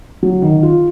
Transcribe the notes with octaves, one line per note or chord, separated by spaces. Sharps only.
F#3
D#3
F4